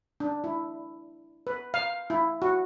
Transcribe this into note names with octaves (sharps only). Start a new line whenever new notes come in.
D4
E4
B4
F5
E4
F#4